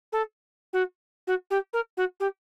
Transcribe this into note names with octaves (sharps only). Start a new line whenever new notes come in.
A4
F#4
F#4
G4
A#4
F#4
G4